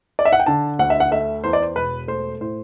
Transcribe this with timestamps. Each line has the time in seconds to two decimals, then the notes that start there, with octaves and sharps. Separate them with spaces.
0.19 D5
0.25 E5
0.33 F#5
0.40 G5
0.46 D3 A5
0.79 D2 F#5
0.90 E5
1.00 F#5
1.11 A3 E5
1.44 E2 C5
1.53 D5
1.62 C5
1.76 E1 B4
2.08 A3 C5
2.41 A2 C5